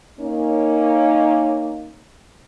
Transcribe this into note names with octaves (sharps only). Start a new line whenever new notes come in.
A#3 C#4 D#4